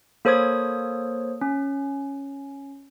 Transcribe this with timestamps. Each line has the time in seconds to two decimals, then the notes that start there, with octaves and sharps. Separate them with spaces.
0.25 A#3 A4 C5 C#5 D#6 G#6
1.41 C#4